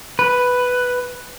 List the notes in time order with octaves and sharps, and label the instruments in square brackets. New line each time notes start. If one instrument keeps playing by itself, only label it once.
[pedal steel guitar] B4